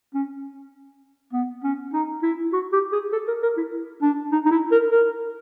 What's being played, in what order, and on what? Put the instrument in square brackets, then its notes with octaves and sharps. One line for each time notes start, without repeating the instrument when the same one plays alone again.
[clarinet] C#4
B3
C#4
D#4
E4
F#4
G4
G#4
A4
A#4
A#4
E4
D4
D#4
D#4
E4
A#4
A#4